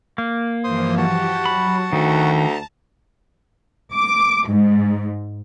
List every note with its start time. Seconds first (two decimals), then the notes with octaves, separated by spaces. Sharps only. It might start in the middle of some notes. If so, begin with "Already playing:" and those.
0.18 A#3
0.64 G2 E3 F3 C5 C6 D#6
0.98 F#4 G4 F#5 A5
1.46 F#3 B5
1.93 D2 D#3 A#5
2.37 A5 A#5
3.94 D6
4.48 G#2